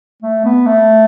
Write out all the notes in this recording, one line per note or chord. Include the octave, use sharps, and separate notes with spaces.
A3
B3
A3